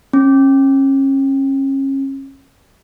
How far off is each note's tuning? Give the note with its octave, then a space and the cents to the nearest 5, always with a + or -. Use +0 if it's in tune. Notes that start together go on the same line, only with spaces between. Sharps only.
C#4 -30